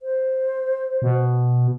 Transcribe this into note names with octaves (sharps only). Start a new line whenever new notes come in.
C5
B2